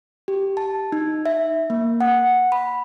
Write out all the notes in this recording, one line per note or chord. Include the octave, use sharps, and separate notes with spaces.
G4
A5
D#4
E5
A#3
F#5
B5